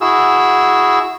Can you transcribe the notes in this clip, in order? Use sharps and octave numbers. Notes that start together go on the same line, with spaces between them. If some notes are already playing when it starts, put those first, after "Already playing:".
E4 F#4 G#4 E6